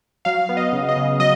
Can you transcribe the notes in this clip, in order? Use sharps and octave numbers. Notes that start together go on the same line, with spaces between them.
F#3 F5
B3
D#5
C#3
D#5
C#3
F#3 D#5